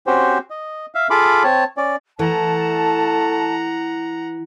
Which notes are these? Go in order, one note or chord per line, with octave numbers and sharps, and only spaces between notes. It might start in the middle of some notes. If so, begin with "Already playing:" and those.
C4 C#4 F#4 G4 C5
D#5
E5 F5
F4 G#4 A4 F5 B5 D6
C4 C#5 A5
C#4 D5
E3 A3 F#5 A5 A#5